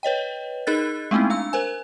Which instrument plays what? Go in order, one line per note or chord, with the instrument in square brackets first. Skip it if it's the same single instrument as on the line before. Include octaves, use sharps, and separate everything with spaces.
[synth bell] B4 C#5 D#5 G5
D#4 G#4 A#4 D#5 F#6 A6
G#3 A3 B3 C4 D#4 E4
D4 F5 E6
A#4 C5 G#5